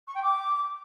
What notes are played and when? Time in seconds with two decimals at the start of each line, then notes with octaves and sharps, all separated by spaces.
0.07 C#6
0.14 G5
0.22 D6